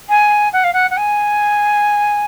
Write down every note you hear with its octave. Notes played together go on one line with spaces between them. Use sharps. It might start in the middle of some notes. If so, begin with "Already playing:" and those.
G#5
F#5
F5
F#5
F#5
G#5